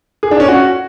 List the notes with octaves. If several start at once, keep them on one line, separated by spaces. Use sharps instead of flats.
G#4
D4
C#4
F#4